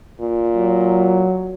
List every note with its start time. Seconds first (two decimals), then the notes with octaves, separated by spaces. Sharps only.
0.21 A#2
0.56 F#3